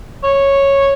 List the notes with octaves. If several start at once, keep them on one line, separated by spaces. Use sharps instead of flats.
C#5